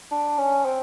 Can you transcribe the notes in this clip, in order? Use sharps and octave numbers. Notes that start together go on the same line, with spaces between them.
D4
C#4
C4